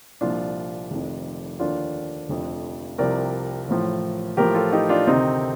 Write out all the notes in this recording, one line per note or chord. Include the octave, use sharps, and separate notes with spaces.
C2 A#2 F3 D4 F4
F1 F2 D#3
D#2 D3 F3 D4 F4
F1 F2 D3 F3
C2 C3 F3 A#4 D5
A1 A2 F3
A1 A2 F3 G4 A#4
F4 A4
D#4 G4
D4 F4
D2 C3 D#3 C4 D#4